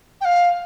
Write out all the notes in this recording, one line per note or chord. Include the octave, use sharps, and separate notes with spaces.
G5
F5